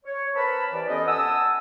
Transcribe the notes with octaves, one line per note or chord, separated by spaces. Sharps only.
C#5
C4 A#4 B4 A5 B5
E3 G4 D5
F2 B3 C#4 C5 D#5
F#5 G#5 A5 D#6 E6